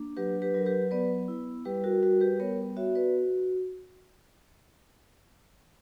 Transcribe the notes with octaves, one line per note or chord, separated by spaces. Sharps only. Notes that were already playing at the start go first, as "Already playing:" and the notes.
Already playing: A#3 D4
F#3 G4 B4
G4 B4
F#3 A#4
G4 B4
B3 B4 D5
E4
G3 G4 B4
F#4 A#4
G3 F#4 A#4
G4 B4
B3 A#4 C#5
F#4 C#5 E5
B4 D5